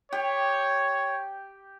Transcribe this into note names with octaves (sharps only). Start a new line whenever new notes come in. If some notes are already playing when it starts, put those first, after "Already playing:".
G4 C#5